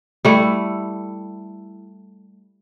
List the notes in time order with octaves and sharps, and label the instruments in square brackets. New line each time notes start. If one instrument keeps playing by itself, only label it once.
[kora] G3 A3 E4